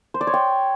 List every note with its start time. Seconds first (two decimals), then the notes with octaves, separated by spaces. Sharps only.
0.14 C5
0.21 D5
0.27 C#5
0.34 G5